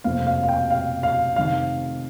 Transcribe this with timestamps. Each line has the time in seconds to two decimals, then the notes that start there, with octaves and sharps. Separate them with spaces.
0.04 F1 F2 F3 A#3 F5
0.27 F5
0.43 F5
0.49 G5
0.71 F5
1.03 F5
1.36 F1 F2 D#3 F5